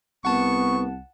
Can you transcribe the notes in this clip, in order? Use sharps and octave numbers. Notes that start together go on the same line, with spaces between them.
C2 B3 F#5 A5 C#6